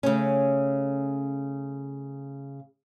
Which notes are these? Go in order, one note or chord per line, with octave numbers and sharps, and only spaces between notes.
C#3 A3 C#4